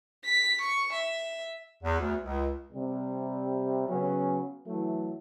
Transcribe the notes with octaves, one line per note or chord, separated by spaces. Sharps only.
B6
C#6
E5
E2
D2
C#2
C3 G3
C#3 F#3 B3 C#4
E3 F#3 A3